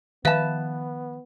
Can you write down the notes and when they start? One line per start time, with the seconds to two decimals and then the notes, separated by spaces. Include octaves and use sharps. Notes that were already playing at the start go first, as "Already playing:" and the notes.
0.25 D#3 F3 B3 B4 E5 F5 A5